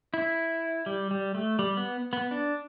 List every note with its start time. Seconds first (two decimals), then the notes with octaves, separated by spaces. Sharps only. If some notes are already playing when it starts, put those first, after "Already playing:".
0.14 E4
0.86 G3
1.11 G3
1.35 A3
1.59 G3
1.77 B3
2.13 B3
2.31 D4